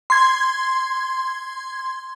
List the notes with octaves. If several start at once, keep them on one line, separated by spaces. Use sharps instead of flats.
C6 G#6